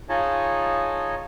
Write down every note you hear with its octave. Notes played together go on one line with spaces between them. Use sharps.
D#4 F4 G#4 C#5 D#5 A5